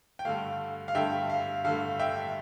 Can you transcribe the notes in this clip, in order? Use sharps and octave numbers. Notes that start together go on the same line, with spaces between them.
G5
G2 D3 A3 F5
F5
G2 D3 A3 E5 G5
F5
G2 D3 A3 F5
E5 G5